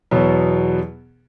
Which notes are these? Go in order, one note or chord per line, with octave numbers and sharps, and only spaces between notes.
E2 B2 F#3 B3